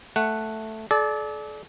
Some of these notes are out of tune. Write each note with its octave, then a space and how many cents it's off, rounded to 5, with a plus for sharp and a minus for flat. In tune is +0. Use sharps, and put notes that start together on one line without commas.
A3 +0 F#5 +5
A4 -45 D5 +0